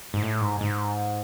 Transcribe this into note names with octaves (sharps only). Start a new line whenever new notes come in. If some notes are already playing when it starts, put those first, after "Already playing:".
G#2
A2
G#2
G#2